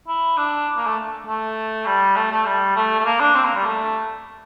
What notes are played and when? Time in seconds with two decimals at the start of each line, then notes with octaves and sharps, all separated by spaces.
0.08 E4
0.37 D4
0.77 A#3
0.87 A3
1.27 A3
1.86 G3
2.16 A3
2.31 A3
2.46 G3
2.76 A3
2.99 A3
3.05 A#3
3.20 D4
3.35 C4
3.45 A#3
3.56 G3
3.65 A3